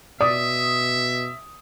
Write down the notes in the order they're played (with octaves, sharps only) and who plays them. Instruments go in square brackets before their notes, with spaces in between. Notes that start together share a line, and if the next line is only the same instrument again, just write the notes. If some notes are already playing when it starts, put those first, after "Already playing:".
[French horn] B2 [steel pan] D5 [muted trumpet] E5 [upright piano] D#6